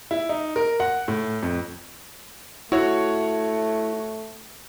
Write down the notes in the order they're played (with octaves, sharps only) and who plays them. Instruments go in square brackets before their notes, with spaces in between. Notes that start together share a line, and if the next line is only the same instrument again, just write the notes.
[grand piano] E4
D#4
A#4
F#5
A2
F2
[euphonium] A3 [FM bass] E4 [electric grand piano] F#4 C#5